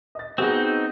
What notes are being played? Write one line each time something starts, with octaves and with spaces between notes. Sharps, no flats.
D#5 A6
B3 C4 D#4 F#4 G#4